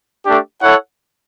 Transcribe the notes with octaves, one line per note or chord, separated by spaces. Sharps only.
A3 D4 G4
E4 A4 C#5 F#5